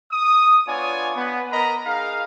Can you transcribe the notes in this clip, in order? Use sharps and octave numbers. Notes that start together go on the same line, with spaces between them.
D#6
B3 D4 F4 C#5 D5 G#5
B3
B3 A#4 D#5 A#5 B5
D#4 G#4 A#4 F5